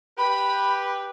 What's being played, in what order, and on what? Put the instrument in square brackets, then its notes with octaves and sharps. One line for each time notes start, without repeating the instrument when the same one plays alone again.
[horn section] G4 B4 [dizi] B5